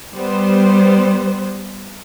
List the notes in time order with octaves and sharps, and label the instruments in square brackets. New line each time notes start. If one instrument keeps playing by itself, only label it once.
[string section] G3 B3 C5